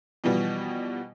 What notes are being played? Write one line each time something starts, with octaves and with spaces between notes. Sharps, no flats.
B2 E3 F3 G3 B3